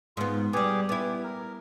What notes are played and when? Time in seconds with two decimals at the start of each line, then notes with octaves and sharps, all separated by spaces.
0.17 G#2 B3 F4
0.53 G3 B3 G4 G#4
0.89 B3 E4 G4
1.24 A#4